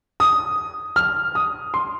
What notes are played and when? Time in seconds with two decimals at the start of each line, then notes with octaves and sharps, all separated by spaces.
0.20 D#6
0.96 F6
1.35 D#6
1.74 C6